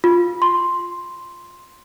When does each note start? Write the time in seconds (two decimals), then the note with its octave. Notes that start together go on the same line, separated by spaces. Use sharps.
0.04 F4
0.42 C6